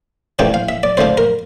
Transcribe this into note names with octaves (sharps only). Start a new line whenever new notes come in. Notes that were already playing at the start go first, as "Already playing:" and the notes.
C3 E3 A3 D4 F4 G5
F5
E5
D5
D3 A3 D4 F4 C5
A#4